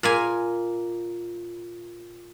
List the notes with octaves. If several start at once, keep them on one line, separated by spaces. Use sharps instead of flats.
A#2 A#3 G#5